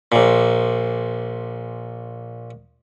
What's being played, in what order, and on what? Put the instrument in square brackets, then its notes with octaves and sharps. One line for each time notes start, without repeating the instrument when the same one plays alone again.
[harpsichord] A#1 A#2